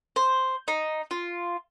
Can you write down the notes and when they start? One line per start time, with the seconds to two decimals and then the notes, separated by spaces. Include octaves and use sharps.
0.16 C5
0.68 D#4
1.11 F4